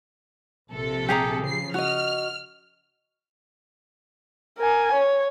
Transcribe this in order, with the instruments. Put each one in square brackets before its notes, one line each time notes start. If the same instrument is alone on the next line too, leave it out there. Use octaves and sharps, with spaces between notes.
[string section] A#1 C3 A4
[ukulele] G4 G#4 A#5
[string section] C#3 F3 C7
[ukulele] F#4 D#5 [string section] F6
[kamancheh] A#4 G#5
C#5